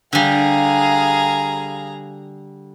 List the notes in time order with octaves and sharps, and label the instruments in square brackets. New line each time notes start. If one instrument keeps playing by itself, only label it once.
[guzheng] D3 G3 [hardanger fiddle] G#4 A#5 [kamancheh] F5